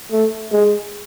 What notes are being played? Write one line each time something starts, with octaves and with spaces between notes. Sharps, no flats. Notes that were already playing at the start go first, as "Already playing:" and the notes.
A3
G#3